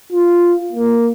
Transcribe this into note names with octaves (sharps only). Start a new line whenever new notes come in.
F4
A#3